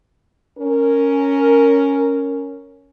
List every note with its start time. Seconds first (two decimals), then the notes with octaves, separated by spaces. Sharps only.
0.57 C#4 A#4